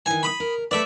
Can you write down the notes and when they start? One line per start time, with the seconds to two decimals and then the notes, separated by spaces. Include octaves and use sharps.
0.06 D#3 E3 G#5
0.23 B5 D#6
0.40 A#4
0.71 A3 B4 D5 E5